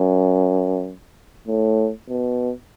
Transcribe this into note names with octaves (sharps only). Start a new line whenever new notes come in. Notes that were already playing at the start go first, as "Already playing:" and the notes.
Already playing: F#2
A2
B2